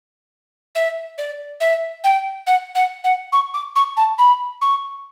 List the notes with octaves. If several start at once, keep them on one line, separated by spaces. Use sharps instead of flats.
E5
D5
E5
G5
F#5
F#5
F#5
C#6
D6
C#6
A5
B5
C#6